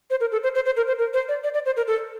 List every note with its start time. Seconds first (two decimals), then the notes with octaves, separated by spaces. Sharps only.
0.10 C5
0.21 A#4
0.32 A4
0.43 C5
0.55 C5
0.65 C5
0.77 A#4
0.87 C5
0.98 A#4
1.13 C5
1.28 D5
1.44 D5
1.54 D5
1.66 C5
1.77 A#4
1.87 A4